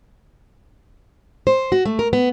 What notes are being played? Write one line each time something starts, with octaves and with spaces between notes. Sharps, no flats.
C5
F#4
A3
A#4
B3